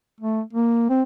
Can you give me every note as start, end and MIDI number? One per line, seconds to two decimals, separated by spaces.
0.20 0.41 57
0.53 0.89 58
0.89 1.02 60